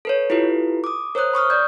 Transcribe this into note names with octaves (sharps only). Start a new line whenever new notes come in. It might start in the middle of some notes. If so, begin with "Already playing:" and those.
A4 B4 C#5
E4 F4 G4 A4 B4
D6 D#6
A#4 C5 C#5 D#6 F#6
B5 C#6 D#6 F6
D5 G6